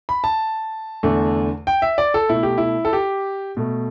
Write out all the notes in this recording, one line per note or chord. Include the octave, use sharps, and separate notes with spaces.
B5
A5
E2 D3 A3
G5
E5
D5
A4
B2 A3 E4
G4
E4
A4
G4
B2 A3